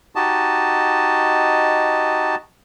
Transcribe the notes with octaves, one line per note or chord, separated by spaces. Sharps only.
D#4 F#4 G4 D#5 A5